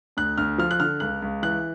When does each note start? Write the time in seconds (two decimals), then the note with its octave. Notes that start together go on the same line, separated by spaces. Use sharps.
0.17 D2 F#6
0.38 D2 F6
0.58 F3 F6
0.71 F#6
0.80 D3 F6
1.00 C#2 F#6
1.22 C#2
1.43 E3 F#6